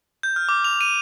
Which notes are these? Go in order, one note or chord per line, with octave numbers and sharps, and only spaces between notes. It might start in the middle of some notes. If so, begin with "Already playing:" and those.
G6
F6
D6
F7
D#7